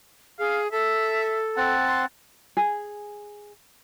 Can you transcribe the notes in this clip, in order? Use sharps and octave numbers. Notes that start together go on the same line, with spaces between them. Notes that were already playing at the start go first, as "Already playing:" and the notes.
G#4 F5
A4 E5
C4 F#5 A5
C6
G#4